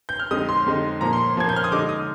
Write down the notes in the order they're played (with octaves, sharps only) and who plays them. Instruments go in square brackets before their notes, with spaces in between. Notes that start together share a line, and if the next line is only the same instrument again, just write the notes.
[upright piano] G6
F6
F2 D3 G#3 D#4 D#6
C6
F2 D3 G#3 D#4
A#2 F3 A#3 A#5
C6
A#2 F3 A#3 G#6
G6
F6
D#6
D3 G#3 D#4 D6
D#6